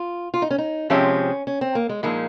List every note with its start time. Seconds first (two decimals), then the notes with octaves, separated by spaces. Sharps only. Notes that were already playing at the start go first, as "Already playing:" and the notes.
Already playing: F4
0.34 F4
0.42 D#4
0.50 C#4
0.58 D#4
0.90 C3 F3 G#3 C4 C#4 G4
1.47 C#4
1.61 C4
1.75 A#3
1.89 G#3
2.03 A#2 F3 G#3 A#3 D#4